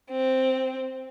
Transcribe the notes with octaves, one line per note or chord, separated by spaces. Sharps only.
C4